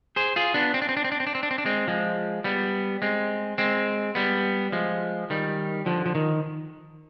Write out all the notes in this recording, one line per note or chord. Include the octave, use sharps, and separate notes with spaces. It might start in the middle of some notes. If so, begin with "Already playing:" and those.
G#4 C5
F4 G#4
B3 D4
C4
D4
C4
D4
C4
D4
C4
D4
C4
D4
C4
D4
G#3 C4
F3 G#3
G3 B3
G#3 C4
G#3 C4
G3 B3
F3 G#3
D#3 G3
D3 F3
F3
D#3